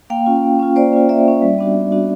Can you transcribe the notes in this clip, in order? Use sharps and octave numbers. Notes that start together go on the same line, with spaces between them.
A#3 F5 G5
C#4 F4
A#3
C#4 F4
A#3 C5 D5
C#4 F4
A#3 D5 E5
C#4 F4
G3
B3 D4 F#4
G3
B3 D4 F#4